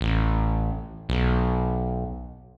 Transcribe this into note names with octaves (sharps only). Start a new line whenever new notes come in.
A1
B1